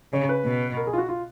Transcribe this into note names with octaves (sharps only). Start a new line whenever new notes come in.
C#3 C#5
B4
B2
A#4
G#4
F4
F#4
F4